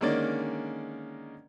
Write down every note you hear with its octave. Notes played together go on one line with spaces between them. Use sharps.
D3 D#3 G#3 A#3 C#4 D5